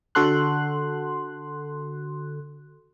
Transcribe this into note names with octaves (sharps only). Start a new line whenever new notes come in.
D3 F#4 A4 C6 F#6